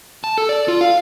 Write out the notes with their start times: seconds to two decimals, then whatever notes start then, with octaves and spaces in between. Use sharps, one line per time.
0.24 A5
0.38 A4
0.49 D5
0.68 F4
0.81 F5